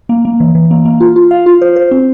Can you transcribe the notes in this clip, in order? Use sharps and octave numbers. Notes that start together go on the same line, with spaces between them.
A#3
A#3
E3
E3
A#3
A#3
F4
F4
F5
F4
C5
C5
C4